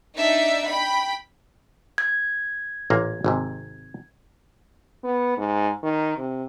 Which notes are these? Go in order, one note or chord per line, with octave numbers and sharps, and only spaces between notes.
D4 D#4 D5 E5
G5 B5
G#6
A1 A#2 A#3
G#1 G#2 C3
B3
G#2
D#3
C3